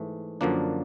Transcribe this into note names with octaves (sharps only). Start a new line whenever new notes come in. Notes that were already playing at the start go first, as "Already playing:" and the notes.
Already playing: G#2 E3 A3
F#2 D3 F3 A#3 D4